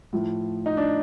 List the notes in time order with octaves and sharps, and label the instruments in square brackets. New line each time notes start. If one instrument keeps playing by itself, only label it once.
[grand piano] A2 F3
D#4
D4